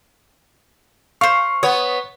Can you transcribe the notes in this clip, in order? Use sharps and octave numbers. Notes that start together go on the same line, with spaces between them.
C5 F5 C#6
B3 C#5 D#6